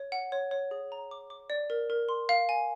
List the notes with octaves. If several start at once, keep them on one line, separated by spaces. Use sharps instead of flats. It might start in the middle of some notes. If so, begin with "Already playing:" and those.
Already playing: C#5
F#5
C#5
C#5
G#4
A#5
D6
D6
D5
A#4
A#4
C6
F5
G#5